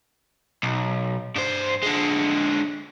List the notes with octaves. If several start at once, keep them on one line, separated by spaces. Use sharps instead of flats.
B1
G2 C5
D3 G#3